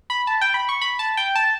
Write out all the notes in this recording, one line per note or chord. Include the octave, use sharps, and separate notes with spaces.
B5
A5
G5
B5
C#6
B5
A5
G5
A5